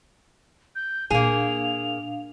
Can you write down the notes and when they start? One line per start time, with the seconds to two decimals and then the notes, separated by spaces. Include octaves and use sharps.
0.75 G6
1.10 A#2 A#3 D4 G#4 F5 F7